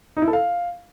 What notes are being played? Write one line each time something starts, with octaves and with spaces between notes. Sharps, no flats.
D#4
E4
A4
F5